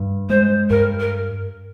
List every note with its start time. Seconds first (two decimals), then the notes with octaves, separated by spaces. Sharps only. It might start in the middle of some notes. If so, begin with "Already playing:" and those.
Already playing: G2
0.29 G#3 C5
0.70 G2 A#4
1.00 A#4